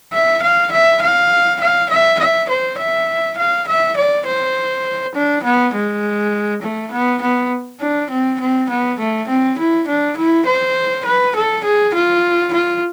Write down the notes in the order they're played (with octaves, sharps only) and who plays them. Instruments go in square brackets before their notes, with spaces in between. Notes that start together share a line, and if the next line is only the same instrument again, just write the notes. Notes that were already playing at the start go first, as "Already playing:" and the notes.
[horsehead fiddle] E5
F5
E5
F5
F5
E5
E5
C5
E5
F5
E5
D5
C5
D4
B3
G#3
A3
B3
B3
D4
C4
C4
B3
A3
C4
E4
D4
E4
C5
B4
A4
G#4
F4
F4